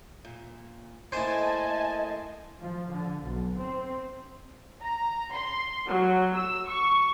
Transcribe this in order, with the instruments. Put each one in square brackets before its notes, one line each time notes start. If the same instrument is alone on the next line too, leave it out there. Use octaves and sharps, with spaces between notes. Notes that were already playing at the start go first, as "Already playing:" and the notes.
[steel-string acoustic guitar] A#2
[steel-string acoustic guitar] A3 A#3 E4 [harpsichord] C5 [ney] D#5 [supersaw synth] G#5 A5
[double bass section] F3
D3
B1
C4
[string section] A#5
C6
F#3
E6
C#6